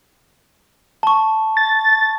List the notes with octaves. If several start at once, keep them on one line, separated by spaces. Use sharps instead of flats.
A5 C#6
A6